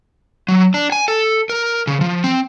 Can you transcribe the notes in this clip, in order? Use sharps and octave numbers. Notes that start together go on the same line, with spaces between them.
F#3
D4
G#5
A4
A#4
C#3
F3
C4